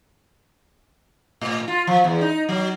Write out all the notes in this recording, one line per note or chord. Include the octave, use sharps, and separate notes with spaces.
A2
F4
F3
E2
D#4
F#3